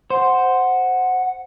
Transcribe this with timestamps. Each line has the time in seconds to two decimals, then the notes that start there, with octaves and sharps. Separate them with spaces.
0.10 C5 F#5